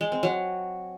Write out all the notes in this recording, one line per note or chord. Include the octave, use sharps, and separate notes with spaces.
G#3
C4
F#3